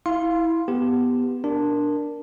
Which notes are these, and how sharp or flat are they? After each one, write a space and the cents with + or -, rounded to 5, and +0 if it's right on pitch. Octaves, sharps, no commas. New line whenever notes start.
E4 -10 F5 +0 C6 +0
B3 +0 G4 +0
D4 +0 A#4 +0